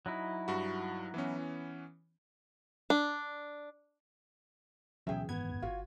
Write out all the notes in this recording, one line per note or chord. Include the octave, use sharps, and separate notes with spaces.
F#3 D#4 E4
G2 F#4
E3 B3 C#4
D4
D2 B2 E3 F#3 C#4 G#4 E5 G5
F#1 G#2 D#3 B3 G#6
F2
G1 F4 F#4